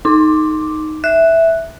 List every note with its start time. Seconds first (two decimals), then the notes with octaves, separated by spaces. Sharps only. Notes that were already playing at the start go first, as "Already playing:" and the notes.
0.05 D#4 D6
1.04 E5 F#6